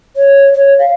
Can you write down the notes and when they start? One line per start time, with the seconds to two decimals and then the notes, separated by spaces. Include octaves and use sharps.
0.16 C#5
0.54 C#5
0.79 F5